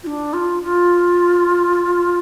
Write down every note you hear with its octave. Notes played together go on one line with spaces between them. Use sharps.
F4
D4
F4
F4